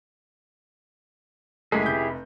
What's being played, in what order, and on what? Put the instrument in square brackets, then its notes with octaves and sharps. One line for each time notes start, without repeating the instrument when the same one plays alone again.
[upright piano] F#1 G#3 A3 [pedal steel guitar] E4 G4 G#4
[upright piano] F1 G6